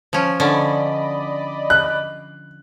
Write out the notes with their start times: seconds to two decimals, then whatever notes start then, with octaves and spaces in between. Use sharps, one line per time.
0.13 F3 C#4
0.40 D3 C#4 D5 D#5 B5
1.70 F#6